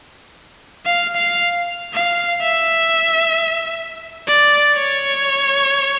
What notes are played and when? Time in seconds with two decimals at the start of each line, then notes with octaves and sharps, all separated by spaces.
0.86 F5
1.16 F5
1.94 F5
2.42 E5
4.28 D5
4.74 C#5